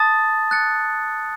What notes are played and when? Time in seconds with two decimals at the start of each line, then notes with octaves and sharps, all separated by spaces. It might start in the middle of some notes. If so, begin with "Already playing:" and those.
Already playing: A5 D#6 A6
0.51 F#6 A6 C#7